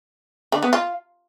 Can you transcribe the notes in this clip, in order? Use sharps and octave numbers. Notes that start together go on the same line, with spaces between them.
D3
B3
F4